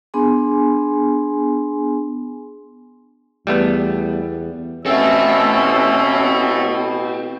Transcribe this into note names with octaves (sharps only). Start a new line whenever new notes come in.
B3 D4 G#4 G#5 C6
E2 G3 A3 B3
A1 B2 C4 C#4 A4 E5 E6